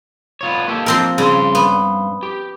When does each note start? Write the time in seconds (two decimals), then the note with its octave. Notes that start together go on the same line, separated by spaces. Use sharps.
0.41 B3 F4 C#5
0.68 A#3 G4 A4
0.86 F3 C4 A#4
1.18 G2 C#3 C6
1.55 B3
2.23 G4